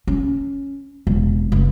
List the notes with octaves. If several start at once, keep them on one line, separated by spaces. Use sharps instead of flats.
C#4
E1
F1